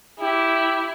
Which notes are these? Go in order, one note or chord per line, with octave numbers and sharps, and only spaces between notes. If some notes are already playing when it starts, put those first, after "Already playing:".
E4 G4